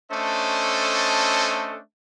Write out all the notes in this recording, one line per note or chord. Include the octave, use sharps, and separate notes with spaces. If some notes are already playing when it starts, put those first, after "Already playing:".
A3 C#4 D4 A4 C5 D#5